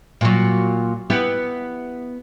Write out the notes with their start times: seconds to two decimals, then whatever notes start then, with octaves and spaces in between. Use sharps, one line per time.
0.21 A#2 F#3
1.10 B3 E4 G4